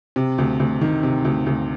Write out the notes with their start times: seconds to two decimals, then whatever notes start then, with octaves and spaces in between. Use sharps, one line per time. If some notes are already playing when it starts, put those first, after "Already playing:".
0.16 C3
0.38 D2
0.60 D2
0.81 D#3
1.03 C3
1.25 D2
1.46 D2